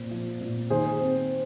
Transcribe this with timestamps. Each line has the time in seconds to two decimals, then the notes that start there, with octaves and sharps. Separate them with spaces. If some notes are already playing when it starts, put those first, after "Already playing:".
Already playing: A#2 C4
0.11 F3
0.41 A#2
0.70 D#3 G#4 C5
1.01 C4